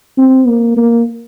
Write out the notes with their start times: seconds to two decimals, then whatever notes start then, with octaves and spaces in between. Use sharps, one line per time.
0.18 C4
0.47 A#3
0.77 A#3